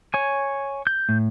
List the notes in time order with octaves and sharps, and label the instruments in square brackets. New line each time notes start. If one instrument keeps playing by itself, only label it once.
[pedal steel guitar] C#5 G#5
G6
[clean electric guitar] A2